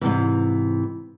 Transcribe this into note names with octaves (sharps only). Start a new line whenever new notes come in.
G#2 C3 E3